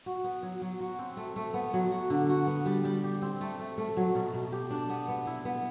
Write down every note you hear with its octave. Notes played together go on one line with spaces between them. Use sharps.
F#4
B3
F#3
F#3
F#4
C4
A3
A3
B3
F#3
F#4
D3
F#4
B3
G3
G3
G4
C4
A3
A3
A3
F#3
B2
B2
G4
D4
B3
B3
E4
B3